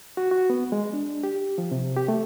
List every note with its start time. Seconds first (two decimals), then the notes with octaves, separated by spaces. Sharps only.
0.17 F#4
0.31 F#4
0.50 B3
0.72 G#3
0.93 D4
1.23 G4
1.58 F3
1.72 C3
1.97 G4
2.08 A3